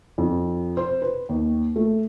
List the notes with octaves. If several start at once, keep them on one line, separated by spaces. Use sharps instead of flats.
F2
C5
B4
D#2
A3